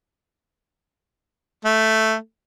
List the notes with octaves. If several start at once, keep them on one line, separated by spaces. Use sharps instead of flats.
A3